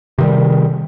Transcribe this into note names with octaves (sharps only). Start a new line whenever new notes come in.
C3 D#3 G3